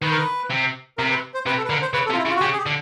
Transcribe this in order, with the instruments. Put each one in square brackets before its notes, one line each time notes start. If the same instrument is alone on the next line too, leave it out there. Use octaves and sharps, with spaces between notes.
[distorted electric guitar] D#3 [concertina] B4
[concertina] A#4
B4
[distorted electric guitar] C3
[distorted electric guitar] C3 [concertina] A#4
[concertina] B4
C5
[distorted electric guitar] C3 [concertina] B4
[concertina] A4
B4
[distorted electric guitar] D3 [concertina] A#4
[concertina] C5
[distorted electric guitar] C#3 [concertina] B4
[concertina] A4
[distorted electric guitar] C3 [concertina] F4
[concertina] E4
[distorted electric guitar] C#3
[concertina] F4
F#4
[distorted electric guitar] C#3 [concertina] G4
[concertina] G#4
G4
[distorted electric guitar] D3